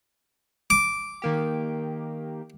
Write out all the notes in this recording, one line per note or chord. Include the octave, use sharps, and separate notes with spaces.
D6
D#3 A#3 G4